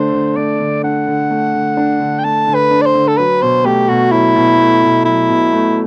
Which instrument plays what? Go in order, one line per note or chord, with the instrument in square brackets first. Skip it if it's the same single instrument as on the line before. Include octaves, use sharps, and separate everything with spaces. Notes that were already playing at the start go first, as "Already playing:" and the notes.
Already playing: [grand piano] D3 A3 D4 [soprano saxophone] C5
[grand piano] D3
[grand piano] A3 [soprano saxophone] D5
[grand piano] D3
[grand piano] D4 [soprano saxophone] F#5
[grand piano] D3
A3
D3
D4
D3
[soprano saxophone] G5
[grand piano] A3 [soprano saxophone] A5
[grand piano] D3
[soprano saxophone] B4
[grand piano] D4
[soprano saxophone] D5
C5
[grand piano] D3
[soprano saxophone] A4
[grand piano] F#3 [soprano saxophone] B4
[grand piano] B2 [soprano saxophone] C5
[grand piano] A3 [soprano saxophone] G4
[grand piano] B2 [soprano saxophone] F#4
[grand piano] F#3 [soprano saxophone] E4
[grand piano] B2
A3
B2
[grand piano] F#3 [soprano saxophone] E4
[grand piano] B2
A3